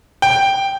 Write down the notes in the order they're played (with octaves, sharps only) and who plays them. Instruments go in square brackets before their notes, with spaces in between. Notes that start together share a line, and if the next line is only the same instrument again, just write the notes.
[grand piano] G5